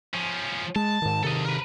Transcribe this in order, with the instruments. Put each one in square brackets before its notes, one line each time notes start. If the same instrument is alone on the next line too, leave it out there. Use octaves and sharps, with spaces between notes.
[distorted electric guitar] F3 C#4
[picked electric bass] G#3 [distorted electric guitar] A5
[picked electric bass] G#2 D#3
[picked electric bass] C3 D#3 [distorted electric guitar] A4 D#5
[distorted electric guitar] A#4 B4